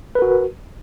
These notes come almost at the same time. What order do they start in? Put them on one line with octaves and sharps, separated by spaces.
B4 A#4 F#4